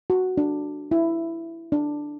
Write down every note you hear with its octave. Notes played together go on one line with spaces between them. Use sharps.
F#4
D4
E4
D4